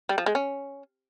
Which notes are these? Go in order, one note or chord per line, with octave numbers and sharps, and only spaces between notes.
G3
F3
G#3
C#4